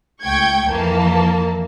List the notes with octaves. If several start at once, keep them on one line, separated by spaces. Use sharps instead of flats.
C#2 A3 G5 C#6 G6 G#6
F2 E3 A#3 A5